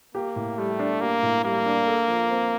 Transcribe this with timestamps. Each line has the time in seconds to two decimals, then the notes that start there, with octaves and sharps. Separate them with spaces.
0.15 A#3 G4
0.36 A2
0.58 G3 A3
0.79 D4
1.01 A#3 G4
1.23 A2
1.44 G3 A#3
1.66 D4
1.87 A4
2.08 F3
2.30 C4